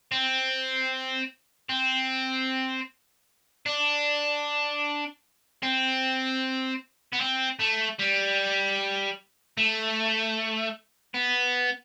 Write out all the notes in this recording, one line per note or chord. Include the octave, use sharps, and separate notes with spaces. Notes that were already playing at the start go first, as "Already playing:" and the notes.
C4
C4
D4
C4
B3
C4
A3
G3
A3
B3